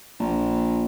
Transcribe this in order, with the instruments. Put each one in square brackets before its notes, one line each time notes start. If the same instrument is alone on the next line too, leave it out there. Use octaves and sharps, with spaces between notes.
[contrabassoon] A#1